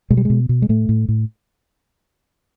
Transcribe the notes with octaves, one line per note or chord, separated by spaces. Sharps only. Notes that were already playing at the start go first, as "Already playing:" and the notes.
B2 G#3
G3
B2 G#3
B2
G#3
A2 A3
A2
A2